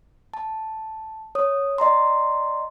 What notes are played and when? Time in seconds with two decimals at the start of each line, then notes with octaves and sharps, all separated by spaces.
0.34 A5
1.35 C#5 D#6
1.78 D5 D#5 A#5 C6